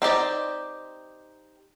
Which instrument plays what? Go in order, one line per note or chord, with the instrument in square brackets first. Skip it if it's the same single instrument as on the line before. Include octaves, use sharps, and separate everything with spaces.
[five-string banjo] C4 D#4 G4 D5